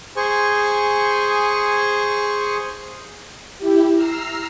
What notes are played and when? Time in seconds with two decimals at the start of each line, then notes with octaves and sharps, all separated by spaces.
0.17 G#4 C5 G#5 C#6
3.58 E4 G4
3.94 A#5 E6 F6 C7